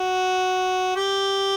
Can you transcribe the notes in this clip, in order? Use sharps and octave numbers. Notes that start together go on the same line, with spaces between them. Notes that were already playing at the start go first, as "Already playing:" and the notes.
Already playing: F#4
G4